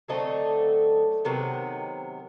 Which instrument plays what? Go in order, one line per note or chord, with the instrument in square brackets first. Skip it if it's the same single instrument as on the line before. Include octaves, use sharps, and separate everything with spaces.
[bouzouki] D3 F#3 A3 C4 D#5
C3 D#3 F#3 B3